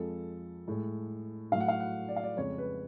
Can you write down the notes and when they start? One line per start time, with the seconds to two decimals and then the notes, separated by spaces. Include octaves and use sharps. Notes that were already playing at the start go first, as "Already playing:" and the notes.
Already playing: F2 F3 G#3 A4
0.68 A2 G#3
1.52 A2 F#3 A3 F5
1.60 F#5
1.68 F5
1.80 F#5
2.09 D5
2.16 F5
2.23 D5
2.37 F2 C#3 G#3 C#5
2.58 B4